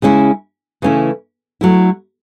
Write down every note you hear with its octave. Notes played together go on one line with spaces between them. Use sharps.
C#3 G#3 C#4 E4
C#3 E3 A3 C#4 E4
F#3 A3 E4